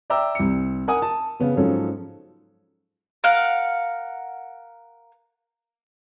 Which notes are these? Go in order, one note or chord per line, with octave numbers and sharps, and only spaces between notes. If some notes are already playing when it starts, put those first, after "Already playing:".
D5 E5 G5 A#5 D6 E6
C2 C#7
A#4 F#5 G#5 D#6
A5
C#3 B3 C#4
G#2 F3 F#3 C#4 A4
A#4 F5 F#5